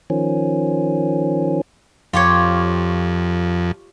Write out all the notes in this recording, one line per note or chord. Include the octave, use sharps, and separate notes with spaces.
D#3 F3 C#4
F2 F4 G4 C#5